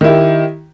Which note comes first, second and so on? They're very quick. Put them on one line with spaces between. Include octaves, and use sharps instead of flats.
D#3 E4 G4